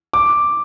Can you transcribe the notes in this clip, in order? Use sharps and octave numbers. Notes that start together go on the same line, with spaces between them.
D6